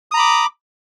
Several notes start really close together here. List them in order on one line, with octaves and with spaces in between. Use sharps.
D#6 A#5 B5 D6